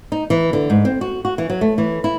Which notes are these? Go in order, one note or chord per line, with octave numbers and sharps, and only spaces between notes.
D#4
E3
D3
G#2
C4
F#4
F#4
E3
F#3
A3
E3
E4